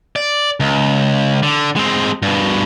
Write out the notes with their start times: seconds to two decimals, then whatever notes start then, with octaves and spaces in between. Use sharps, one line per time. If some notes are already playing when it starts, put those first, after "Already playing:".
0.16 D5
0.60 C#2
1.43 D3
1.76 G#3 C4
2.22 G2 B2